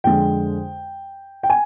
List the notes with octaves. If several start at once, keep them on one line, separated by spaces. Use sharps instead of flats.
F2 D3 G#3 G5
G5
G#5